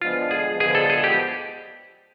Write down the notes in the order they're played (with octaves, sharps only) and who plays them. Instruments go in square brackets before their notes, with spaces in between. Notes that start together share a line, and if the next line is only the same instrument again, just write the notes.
[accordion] D3 F3 G#3 B3 [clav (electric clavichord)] F4
[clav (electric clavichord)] G#4
[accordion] D3 F3 G#3 B3 [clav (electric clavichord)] G#4
[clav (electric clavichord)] A4
G#4
G4